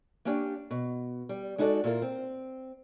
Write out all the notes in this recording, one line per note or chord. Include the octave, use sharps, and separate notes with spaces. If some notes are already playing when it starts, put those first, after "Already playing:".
A#3 C#4 D4 G4
B2
G3
G#3 D#4 E4 F#4 A4 D5
A#2 E4 F4 A#4
C4